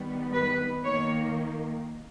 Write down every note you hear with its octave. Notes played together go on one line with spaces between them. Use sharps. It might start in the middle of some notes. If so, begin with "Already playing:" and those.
Already playing: D#3 G3 B3
B4
D#3 A#3 C#5